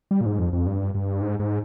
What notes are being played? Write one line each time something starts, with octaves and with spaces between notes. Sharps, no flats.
G3
A#2
G#2
F2
F2
G2
G2
G#2
G#2